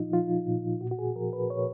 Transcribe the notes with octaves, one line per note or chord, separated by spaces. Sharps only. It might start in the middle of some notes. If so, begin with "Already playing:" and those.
Already playing: A#2 F3 D#4 F4
F3 F4
A#2
A#2 F#4
F#4
G#4
F3 A#4
B4
A#2 C#5